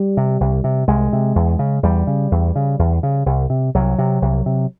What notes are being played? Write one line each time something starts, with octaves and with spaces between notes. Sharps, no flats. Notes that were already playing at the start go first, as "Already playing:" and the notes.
Already playing: G3
C3
C2
C3
C2 G#3
C3
E2
C#3
E2 G3
C#3
E2
C#3
E2
C#3
C2
C3
C2 F#3
C3
C2
C3